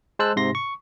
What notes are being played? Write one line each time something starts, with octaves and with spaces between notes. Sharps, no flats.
G#3 C5 A5 E6 F#6
G#2 C3 C6 A#6
C#6